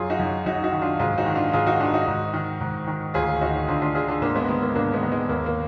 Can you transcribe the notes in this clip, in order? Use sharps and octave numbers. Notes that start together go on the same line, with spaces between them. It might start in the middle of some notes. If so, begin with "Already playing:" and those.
Already playing: F#2 F4 G#4
D#4 F#4
F#2
F#2 D#4 F#4
D#4 F#4
D#3
D4 F4
G#2 F4 G#4
D#4 F#4
D#3
D4 F4
G#2 F4 G#4
D#4 F#4
D#3 D4 F4
D#4 F#4
G#2
D#3
G#2
D#3
D2 F4 G#4
D2 D#4 F#4
D2 D4 F4
D4 F4
D3 F4 G#4
D4 F4
G#2 A#3 D4
G#3 B3
D#3 G#3
A#3
G#2 A#3 D4
G#3 B3
D#3
G#3
D#2 A#3
A#3